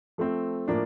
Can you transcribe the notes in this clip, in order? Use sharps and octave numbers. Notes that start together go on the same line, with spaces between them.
F3 A3 C4
A2 F3 A#3 D4